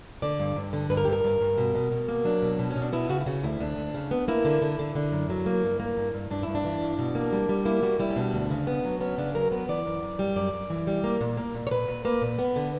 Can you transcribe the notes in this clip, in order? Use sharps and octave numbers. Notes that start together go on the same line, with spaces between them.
D3 D5
G2
G2
D3
G2 B4
A#4
G2 G4
A#4
G2
G2
B2
B2
B2
A#3
F#3 D4
B2
B2
C#4
B2
D4
B3 E4
C#3 F#4
E4
C#3 F#4
D2 E4
D2 D4
D2
C#3
B3
A#3 E4
D3
D3
D3
D3
F#2
F#3
A#3
G2
A#3
G2
G2
G2 D4
G2 E4
D4
E3
G2
B2
A#3
G3
G3
A#3 E4
G3 F#4
G3 E4
C#4
B2 D4
D2
C#3
B3
F#3
B3 C#4
C#3 D4
F#3 A#4
B3 B4
E3 D5
F#2
F#2
G3
F#2 D5
F#2
E3
G3
A#3
A#2
A#3
A#2
C#5
A#2 B4
A#2
A#3 B4
A#2
B3
D3